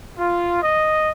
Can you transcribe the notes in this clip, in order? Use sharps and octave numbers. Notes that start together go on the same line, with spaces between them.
F4
D#5